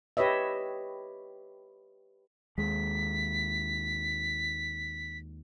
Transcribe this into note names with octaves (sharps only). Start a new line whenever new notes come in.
G4 B4 C#5 D#5 E5
D#2 G#3 B6